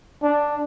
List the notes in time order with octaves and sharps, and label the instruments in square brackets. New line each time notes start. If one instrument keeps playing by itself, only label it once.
[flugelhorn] D4